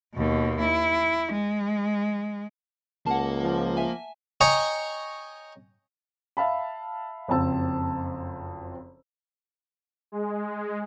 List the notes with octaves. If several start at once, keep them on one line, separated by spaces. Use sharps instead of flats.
D#2 B2
E4
G#3
C#2 A#3 F#5 A5
F3
E5 G#5
C#5 D#5 G5 G#5 A#5 C#6
E5 F5 A5 B5
F#1 F2 C4 A5 E6
G#3